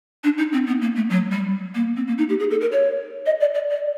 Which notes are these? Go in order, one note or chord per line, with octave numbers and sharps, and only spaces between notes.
D4
D#4
C4
B3
A#3
A3
F#3
G3
A#3
C4
A#3
D#4
G4
G#4
A4
A#4
C#5
D#5
D5
D5
D5